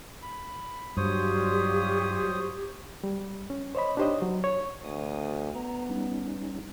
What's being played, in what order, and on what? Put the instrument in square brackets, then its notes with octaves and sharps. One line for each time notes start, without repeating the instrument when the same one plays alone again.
[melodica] B5
[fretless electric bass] G2 [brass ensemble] F#3 G3 F4 [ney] G4 [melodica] C5 C#5 D#6
[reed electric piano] G3
C#4
C5 C#5 D#5 B5
D4 D#4 G4 C5 C#5 D#5
F#3
C#5
[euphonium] D2 [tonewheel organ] D#6
[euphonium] B3 [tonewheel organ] A#5
[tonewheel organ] G3 C#4 D#4